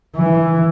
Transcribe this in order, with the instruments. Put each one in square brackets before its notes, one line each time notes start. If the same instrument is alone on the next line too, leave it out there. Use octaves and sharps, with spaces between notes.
[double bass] E3